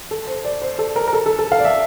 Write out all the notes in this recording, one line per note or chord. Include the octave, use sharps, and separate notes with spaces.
A4
C5
D5
C5
A4
A#4
A#4
A4
A4
A4
F5
D5
E5